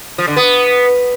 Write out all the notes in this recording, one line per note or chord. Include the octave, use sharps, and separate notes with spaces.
F3
D3
B3